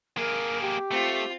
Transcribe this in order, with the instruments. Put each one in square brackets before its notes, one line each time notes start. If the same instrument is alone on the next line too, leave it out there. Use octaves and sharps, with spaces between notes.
[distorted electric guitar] A#3 G#4 [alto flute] A#4
[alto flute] G4
[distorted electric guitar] A3 [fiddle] C4 F4